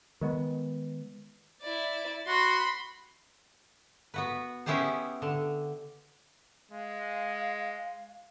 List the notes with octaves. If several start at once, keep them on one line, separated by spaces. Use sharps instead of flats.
D#3 G#3 B3
E4 D5
F#4 B5 C6
B3 F#4 B4
B3 C#4 E4 G4 G#4 C5
D3
G#3 F5